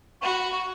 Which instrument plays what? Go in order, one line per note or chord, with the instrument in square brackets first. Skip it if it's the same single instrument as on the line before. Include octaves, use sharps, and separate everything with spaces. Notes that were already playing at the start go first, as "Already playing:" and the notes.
[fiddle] F#4 [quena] B5 C#6
[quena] C#6